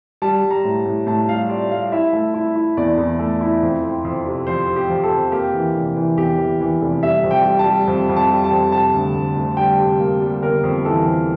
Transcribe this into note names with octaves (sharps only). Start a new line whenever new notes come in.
G3 A5
G3
A#5
A2
A2
A2 A5
G3 F5
F4 D5
G3 F5
E4 E5
A3
E4
E4
E2 D5
E2
A3
E4
F2
C4
F2
C3
F3 C5
C3
G4
F3
A4
F2
A#3 G4
E3
F1
E3
E2 G4
E3
E3
F1
G3 E5
F2
G5
G3
A5
G3
F2
F2
A5
G3
A5
F2
C3 A5
D2
D2
D2
G3 G5
C3
A#3
G3
G1 A#4
F2
E3 A4
F2